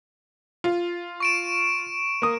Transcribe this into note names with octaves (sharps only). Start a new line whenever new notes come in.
F4
C#6 D7 E7
A#3 D#6